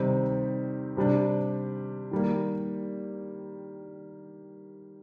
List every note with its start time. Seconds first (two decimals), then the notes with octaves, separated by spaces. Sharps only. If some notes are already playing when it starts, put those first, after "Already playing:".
Already playing: C3 D#3 G3 C4 D#4
0.97 C3 G3 D4
2.11 D#3 G3 A#3